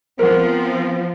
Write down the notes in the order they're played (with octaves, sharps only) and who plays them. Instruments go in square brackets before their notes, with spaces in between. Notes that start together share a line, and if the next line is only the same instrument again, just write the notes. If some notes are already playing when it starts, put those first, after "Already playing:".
[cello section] F3 [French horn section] B3 C4 [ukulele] A#4 [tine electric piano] C5 F#5